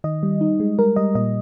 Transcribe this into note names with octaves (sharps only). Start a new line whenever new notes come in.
D#3 D#5
G3
D#4
G#3
G3 A#4
G3 D#5
A#2 D#5